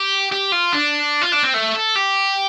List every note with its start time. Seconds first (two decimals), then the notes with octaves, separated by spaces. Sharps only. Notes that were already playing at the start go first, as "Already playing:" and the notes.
Already playing: G4
0.32 G4
0.52 F4
0.72 D4
1.22 F4
1.32 D4
1.44 C4
1.54 A3
1.74 A4
1.96 G4